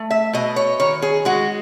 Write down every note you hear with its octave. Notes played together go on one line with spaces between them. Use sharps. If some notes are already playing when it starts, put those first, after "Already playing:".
Already playing: A3
E5
B2 D#5
C#5
D#3 C#5
G#4
G#3 F#4